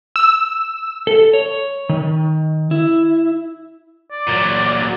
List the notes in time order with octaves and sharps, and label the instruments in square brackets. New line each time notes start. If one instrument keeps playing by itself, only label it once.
[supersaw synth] E6
[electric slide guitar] A4
C#5
D#3
E4
[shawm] D5
[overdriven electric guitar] A#2 F#3